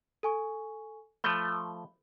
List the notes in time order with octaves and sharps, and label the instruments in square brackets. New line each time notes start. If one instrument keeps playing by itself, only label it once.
[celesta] A4 G#5 C#6
[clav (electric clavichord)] F3 A3 [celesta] B5 G7